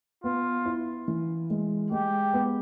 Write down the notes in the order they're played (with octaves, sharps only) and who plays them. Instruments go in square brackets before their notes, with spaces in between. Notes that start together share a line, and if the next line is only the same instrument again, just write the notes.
[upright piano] B3 [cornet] F4
[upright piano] E4
E3
G#3
[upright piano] G#3 [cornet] G4
[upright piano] B3